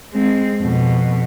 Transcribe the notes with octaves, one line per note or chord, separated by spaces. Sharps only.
G#3 C4
F2 B2